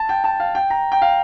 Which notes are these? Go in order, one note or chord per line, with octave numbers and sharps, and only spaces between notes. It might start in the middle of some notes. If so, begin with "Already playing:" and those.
Already playing: A5
G5
A5
F5
G5
A#5
G5
F5